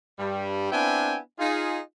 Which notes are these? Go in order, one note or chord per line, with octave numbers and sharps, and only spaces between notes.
G2 G3
B3 C4 D4 E4 G5 G#5
D#4 F4 G#4